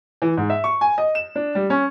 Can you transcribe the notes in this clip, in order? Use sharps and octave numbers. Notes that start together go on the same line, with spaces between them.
E3
G#2
E5
C#6
G#5
D#5
E7
D4
G3
C#4